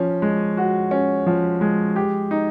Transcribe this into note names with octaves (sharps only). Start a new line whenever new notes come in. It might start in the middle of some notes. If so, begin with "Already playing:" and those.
Already playing: F3 C#4
G#3
F#4
C#4
F3
G#3
G4
D#4